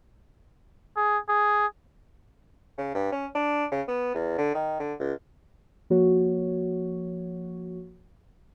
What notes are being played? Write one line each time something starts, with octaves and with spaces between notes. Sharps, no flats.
G#4
G#4
C#3
G2
C#4
D4
C#3
B3
E2
D3
D#3
D3
C#2
F3 A#3 F#4 C#5